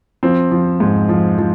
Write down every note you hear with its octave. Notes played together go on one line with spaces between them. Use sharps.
F3 C4
F3
G#2
F3
F3